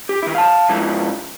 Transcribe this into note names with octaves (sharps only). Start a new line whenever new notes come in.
G4
D#3 E4
F5 A5
G#2 F3 E4